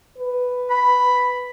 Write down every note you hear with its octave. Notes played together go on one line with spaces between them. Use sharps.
B4
B5